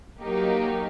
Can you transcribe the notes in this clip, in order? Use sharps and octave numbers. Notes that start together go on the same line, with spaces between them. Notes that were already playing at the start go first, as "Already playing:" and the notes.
F#3 A#3 D#4 G4